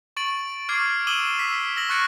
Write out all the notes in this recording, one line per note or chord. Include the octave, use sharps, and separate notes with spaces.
C#6 A6 D7 F#7
C#6 D6 F6 G#6 C7 D7
D6 E6 D#7 E7 F#7 G7
E6 B6
E6 A#6 F#7
C#6 F#6 A6 C#7 D7